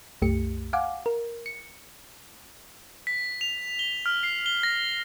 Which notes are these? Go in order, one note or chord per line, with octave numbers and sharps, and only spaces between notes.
C2 F#2 A3 G4 C#7
F5 F#5 G#5 D6
A#4
C#7
B6
F7
G7
F6
C7
G7
A#6